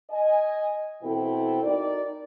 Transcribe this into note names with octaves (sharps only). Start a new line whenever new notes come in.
D#5 G#5
B2 E3 C4 E4 A4 G5
D#4 F#4 A#4 D5